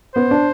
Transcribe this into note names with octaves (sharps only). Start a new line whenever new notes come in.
B3 C5
D4